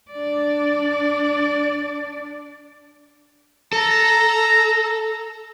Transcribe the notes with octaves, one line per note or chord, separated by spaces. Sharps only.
D4 D5
A4 A#5